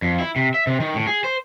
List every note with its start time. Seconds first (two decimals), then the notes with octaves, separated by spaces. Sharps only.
0.02 F2
0.20 E4
0.36 C3
0.54 E5
0.67 C3
0.80 D#3
0.94 A2
1.07 G#4
1.24 C5